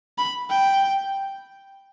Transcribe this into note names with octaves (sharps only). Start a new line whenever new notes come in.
B5
G5